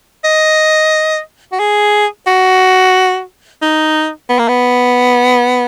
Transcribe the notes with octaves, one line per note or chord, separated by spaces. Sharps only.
D#5
F#4
G#4
F#4
D#4
B3
A#3
B3